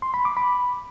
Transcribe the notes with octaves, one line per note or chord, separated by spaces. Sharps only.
C6
B5
D6
B5